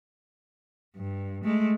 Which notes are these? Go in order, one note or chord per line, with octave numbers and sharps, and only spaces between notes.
G2
G#3 A3